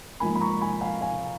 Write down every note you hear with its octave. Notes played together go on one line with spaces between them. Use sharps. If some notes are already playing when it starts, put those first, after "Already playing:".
G#2 F3 A#3 G#5 B5
B5
A#5 C#6
G#5 B5
F5 G#5
F5 G#5